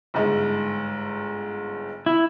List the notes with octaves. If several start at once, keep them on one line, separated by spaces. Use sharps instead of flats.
G1 G#2
E4